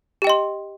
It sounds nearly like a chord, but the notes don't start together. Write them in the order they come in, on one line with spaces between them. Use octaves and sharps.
G4 G5 D#5 C6